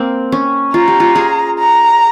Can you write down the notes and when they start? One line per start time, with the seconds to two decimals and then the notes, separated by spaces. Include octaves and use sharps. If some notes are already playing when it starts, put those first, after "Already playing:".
Already playing: A#3 C4
0.32 C#4
0.74 F4 A#5
0.88 G4
1.00 F4
1.15 G#4
1.58 A#5